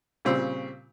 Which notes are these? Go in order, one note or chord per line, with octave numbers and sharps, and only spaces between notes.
A#2 C#3 G3 C4 C#6 E6